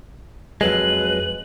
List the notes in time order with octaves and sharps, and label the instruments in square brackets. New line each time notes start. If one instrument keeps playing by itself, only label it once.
[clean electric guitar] F2 F#3 G#3 [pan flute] B4 [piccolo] F#7